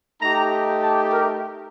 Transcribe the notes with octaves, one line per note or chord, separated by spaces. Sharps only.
A3 D#4 G4 A#5
A5
A#4